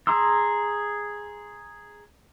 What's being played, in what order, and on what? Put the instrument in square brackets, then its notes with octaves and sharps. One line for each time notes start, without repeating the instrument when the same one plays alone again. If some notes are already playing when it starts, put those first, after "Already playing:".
[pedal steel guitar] G#4 A#5 C6 E6